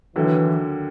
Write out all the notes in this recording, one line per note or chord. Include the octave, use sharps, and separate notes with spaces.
D#2 D3 E3 F#3